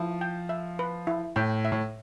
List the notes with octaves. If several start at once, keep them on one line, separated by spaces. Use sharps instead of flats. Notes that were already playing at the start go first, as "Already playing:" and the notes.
Already playing: F3 E4
G5
E5
B4
E4
A2 G5
E5
A2